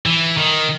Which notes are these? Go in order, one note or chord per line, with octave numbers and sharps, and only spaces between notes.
E3
D#3